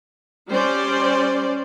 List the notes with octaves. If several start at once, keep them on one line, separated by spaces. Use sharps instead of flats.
G3 C#4 C5 D5